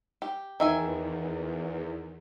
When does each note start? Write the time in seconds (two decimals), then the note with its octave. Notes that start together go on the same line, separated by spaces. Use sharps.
0.22 G4
0.60 E2 D#3 E5 G#5